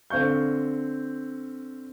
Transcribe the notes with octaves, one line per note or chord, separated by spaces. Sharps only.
D3 C4 F5 C#6 G6